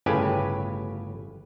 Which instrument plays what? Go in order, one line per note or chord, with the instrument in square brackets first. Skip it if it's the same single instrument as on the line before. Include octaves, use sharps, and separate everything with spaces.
[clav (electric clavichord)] G1 A2 C#3 G4 B4 G#5